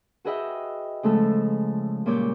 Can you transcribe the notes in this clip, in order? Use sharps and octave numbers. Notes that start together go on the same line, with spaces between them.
F#4 G#4 B4 D#5 E5 G5
C#3 F3 G#3 A3 A4
A#2 C#3 G3 C#5 D6 G6